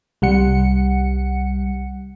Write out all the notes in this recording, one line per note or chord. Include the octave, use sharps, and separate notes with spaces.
C2 G3 F#5 C#7